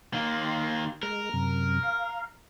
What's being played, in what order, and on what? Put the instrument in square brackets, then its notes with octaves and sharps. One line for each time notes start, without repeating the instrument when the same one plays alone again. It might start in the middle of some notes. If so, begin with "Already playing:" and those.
[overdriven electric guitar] D#3 A#3 [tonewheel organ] C6
[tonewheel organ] G#3 [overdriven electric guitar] A#4
[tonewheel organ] F#2 C3
F5